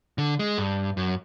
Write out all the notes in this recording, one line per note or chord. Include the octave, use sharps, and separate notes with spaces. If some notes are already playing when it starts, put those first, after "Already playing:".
D3
G#3
G2
F#2